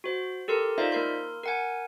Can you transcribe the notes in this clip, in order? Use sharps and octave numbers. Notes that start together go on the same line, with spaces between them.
F#4 C5
G4 A4 A#4 C6
D#4 F4 C5 D5 E5 F5
A#3 A#4 C6
A#4 F#5 G#5